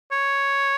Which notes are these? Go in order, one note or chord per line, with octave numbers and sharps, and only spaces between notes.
C#5